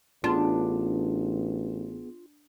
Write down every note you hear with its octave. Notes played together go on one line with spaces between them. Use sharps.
A1 B3 D4 F4 G#4